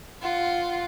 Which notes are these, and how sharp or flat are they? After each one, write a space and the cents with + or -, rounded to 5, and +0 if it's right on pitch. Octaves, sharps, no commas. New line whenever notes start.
F4 +0 F#5 +10